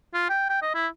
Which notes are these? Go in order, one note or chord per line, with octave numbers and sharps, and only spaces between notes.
F4
G5
G5
D#5
E4